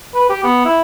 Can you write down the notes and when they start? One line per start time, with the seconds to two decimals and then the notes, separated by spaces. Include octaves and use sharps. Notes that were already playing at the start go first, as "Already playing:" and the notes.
0.15 B4
0.30 G4
0.43 B3
0.65 E4